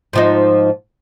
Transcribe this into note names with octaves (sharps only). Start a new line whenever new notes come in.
G#2 F3 D#4